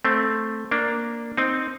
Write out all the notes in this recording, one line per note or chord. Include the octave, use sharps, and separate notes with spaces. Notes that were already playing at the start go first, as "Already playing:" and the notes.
A3 C4
A#3 D4
C4 D#4